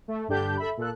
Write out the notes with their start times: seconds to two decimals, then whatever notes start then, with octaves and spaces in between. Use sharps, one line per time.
0.08 A3
0.28 G2 D3 D4 G4 G6
0.57 A4 E5 B5
0.77 A#2 A4 F#6